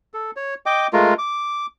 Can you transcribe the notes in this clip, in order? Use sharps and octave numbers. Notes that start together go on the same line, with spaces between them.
A4
C#5
D#5 G5 D6
G#3 A3 F4 A#4
D6